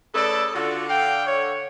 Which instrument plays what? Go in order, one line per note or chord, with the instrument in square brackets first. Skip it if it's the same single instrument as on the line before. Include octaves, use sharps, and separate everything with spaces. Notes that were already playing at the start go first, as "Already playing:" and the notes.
[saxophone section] C#3 A4 [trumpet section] A3 B4 D5
[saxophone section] D3 [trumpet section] F4 F#4 A4
[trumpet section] F5 G5
C#5